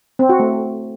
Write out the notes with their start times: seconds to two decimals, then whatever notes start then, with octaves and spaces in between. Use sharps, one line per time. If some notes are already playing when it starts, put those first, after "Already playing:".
0.19 C4
0.29 F#4
0.40 A3